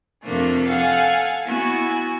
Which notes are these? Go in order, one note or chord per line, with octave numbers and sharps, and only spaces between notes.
F2 C3 F3 A3 A#3 D4
A4 F5 F#5 G#5
B3 E4 F#4 G#5